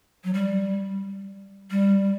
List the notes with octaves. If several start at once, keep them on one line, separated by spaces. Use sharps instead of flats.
F#3
G3
G3